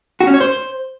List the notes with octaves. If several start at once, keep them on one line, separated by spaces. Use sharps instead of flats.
F#4
C#4
C#5
C5